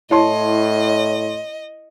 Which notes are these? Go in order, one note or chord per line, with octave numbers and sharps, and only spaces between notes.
A2 E4 C#5 D#5 A5 C6